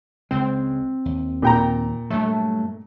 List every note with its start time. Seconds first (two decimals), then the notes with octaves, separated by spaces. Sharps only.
0.31 C#2 C#3 G#3 C4
1.05 D#2
1.42 A#2 G5 A#5
2.10 G2 F#3 A3